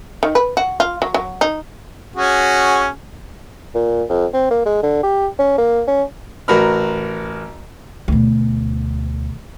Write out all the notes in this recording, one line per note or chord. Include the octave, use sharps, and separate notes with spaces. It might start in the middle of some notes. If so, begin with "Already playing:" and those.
D#3
B4
F#4
F4
F#3
F#3
D#4
C#4 F#4 G#4
A#2
F2
C4
A#3
G#3
D3
G4
C#4
A#3
C#4
A1 F#4 A#4 B4 B5 F6
D2 B2